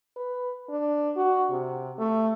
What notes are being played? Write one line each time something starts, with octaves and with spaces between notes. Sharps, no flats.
B4
D4
F#4
C3
A3